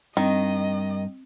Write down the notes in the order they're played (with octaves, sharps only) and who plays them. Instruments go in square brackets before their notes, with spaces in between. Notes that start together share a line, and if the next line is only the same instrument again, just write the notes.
[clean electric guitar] G2 [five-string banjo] D#3 [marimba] C4 [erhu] D#5